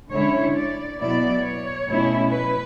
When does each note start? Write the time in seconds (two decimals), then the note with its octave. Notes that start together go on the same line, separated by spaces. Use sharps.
0.10 D3 G#3 C#4 E4 C#5
0.55 D5
0.99 B2 F#3 B3 E4 D5
1.44 C#5
1.87 B2 A3 C#4 E4
2.31 B4